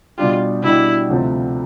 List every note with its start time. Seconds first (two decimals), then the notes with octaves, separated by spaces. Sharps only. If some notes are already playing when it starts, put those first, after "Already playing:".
0.18 B2 G3 D4 F4 G4
0.63 B2 G3 D4 E4 G4
1.09 D2 C3 F3 A3 C4